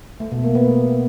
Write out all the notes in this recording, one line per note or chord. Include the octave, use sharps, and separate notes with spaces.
A3
B2
A#3
B3